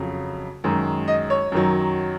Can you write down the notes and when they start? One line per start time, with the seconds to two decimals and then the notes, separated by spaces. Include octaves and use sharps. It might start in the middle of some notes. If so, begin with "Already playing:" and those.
Already playing: F2 C#3 F#3
0.64 F#2 D#3 G#3
1.08 D#5
1.30 C#5
1.52 F#2 D#3 F#3